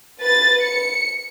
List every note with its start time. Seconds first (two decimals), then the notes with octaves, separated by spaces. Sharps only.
0.20 B4 A6
0.62 C#7